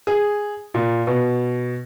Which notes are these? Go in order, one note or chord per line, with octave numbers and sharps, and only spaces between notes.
G#4
A#2
B2